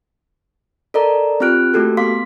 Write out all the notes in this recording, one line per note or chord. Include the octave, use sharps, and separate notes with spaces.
A4 A#4 D5 D#5 A#5
C4 F4 G4 F6 F#6 D7
A3 A#3 F#4 G4 A4
B3 F5 C6 D6 B6